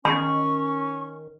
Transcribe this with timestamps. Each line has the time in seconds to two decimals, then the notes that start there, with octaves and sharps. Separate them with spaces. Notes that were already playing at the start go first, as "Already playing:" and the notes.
0.05 D#3 C#4 C6 C#6